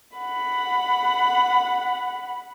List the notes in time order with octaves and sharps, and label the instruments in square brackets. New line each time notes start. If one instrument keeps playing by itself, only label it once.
[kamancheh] F#5 B5